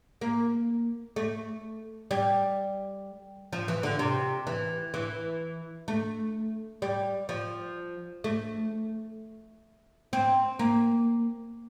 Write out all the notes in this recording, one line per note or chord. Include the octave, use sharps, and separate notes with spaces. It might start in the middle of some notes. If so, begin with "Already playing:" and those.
A#3
A3
G3
F3
E3
D3
C3
E3
E3
A3
G3
F3
A3
C4
A#3